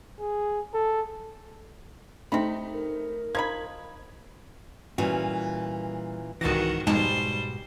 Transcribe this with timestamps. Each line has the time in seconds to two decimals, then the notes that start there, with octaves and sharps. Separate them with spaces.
0.20 G#4
0.74 A4
2.32 C3 A3 D#4 B5
2.73 A#4
3.35 F3 D#4 B5 G#6
4.98 A#2 E3 G3 C#4 F#4
6.41 C2 G#2 D#3 E3 F#4 A6 A#6
6.87 F2 G#2 B2 G3 G#3 D#4 C5 A5